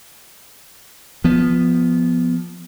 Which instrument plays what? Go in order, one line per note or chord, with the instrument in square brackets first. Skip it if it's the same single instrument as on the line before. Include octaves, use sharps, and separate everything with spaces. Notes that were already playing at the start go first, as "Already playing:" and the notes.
[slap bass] F3 B3